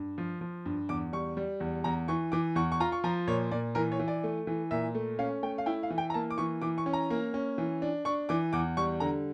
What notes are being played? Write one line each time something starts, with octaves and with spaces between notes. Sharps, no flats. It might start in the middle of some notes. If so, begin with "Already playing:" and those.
Already playing: G2
F3
F3
G2
E2 D6
G3 C#6
G3
E2
E2 A#5
E3 C#6
E3 D6
E2 C#6
C#6
F4 A#5
C#6
F3 A#5
A#2 C#5
A#2 D5
E3 A#4
C#5
E3
D5
A3
E3
A#2 E5
A3
C#4 F5
A3 G5
F5
E4 G5
F5
E3
G5
A#5
A#3 A5
D6
E3 C#6
E3 D6
C#6
C#4
A#5
A#3
C#4
E3
D4
D4 C#6
E3 D6
E2 D6
G3 C#6
D3 A#5